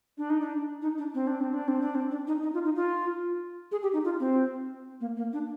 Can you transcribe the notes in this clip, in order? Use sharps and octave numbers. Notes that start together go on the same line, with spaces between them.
D4
D#4
D4
D#4
D4
C4
D4
C4
D4
C4
D4
C4
D4
D#4
D#4
F4
D#4
F4
G#4
G4
D#4
F4
C4
A#3
A#3
D4